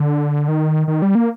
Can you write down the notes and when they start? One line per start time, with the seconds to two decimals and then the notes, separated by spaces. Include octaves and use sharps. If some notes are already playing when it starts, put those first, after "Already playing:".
Already playing: D3
0.48 D#3
0.88 D#3
1.02 G3
1.15 A#3